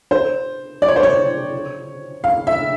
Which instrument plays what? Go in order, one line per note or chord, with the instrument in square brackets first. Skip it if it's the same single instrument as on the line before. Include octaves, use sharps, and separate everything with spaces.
[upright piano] C5
D5
C#5
C5
C#5
F5
E5